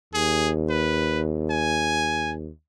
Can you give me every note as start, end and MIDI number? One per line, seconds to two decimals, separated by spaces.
0.14 2.50 39
0.14 0.51 68
0.69 1.21 71
1.51 2.32 80